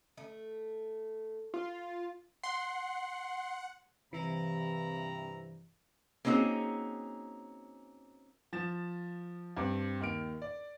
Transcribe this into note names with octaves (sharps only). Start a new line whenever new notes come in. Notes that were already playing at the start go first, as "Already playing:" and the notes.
A3
F4
F#5 C6
G2 C3 E3 E4 A#5
A#3 C4 C#4 D#4 F#4 G#4
F3 A6 E7
G2 C4 D6
D#2 D#3 F6 D7
D5